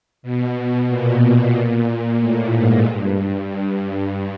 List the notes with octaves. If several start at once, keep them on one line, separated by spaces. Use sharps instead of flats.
B2
A#2
A2
G#2
G2
G2